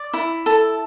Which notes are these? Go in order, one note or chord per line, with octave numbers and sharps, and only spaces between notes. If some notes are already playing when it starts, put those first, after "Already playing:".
Already playing: D5
E4
A4